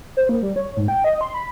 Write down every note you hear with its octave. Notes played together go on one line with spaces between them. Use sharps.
C5
A#3
G3
C#5
G#2
G5
D#5
C6
B5